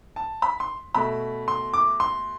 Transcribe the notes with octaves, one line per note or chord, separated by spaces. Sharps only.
A5
B5
C6
B2 A3 B5
C6
D6
C6